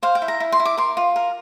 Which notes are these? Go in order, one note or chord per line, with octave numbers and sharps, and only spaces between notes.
C5 F5
G5
E4
A#5
E4
C6
E4
D6
A#4 C6
F4
A#4